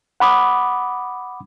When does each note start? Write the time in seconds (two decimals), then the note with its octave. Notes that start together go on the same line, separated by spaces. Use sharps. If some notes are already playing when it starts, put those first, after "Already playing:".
0.20 F#5 B5 D6 D#6